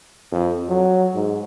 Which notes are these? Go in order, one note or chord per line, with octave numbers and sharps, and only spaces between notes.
F2
F#3
G#2